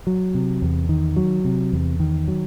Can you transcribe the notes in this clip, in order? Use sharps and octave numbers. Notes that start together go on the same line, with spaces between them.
F#3
C3
E2
D#3
F#3
C3
E2
D#3
F#3